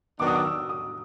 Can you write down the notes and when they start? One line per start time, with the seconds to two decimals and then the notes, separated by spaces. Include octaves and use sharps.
0.20 D#3 F#3 B3 D4 F#4 D6
0.27 D#6
0.35 D6
0.45 E6
0.69 D#6